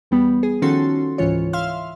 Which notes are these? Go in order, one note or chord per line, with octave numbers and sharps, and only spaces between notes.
E2 G3 B3
G#4
D#3 F3 C#4 F#4 A4 C6
G1 C#2 G#2 E3 F4 C#5
E5 F5 C6 F6